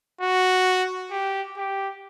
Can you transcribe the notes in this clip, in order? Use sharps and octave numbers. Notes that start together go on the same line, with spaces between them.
F#4
G4
G4